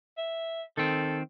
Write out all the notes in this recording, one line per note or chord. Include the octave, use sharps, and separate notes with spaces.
E5
D#3 C4 A4